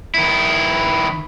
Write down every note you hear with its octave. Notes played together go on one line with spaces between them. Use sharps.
D#3 E4